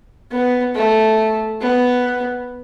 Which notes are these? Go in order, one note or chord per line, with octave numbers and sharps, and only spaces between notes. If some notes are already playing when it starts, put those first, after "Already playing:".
B3
A3
B3